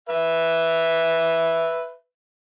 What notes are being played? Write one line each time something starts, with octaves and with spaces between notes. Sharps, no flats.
B4 E5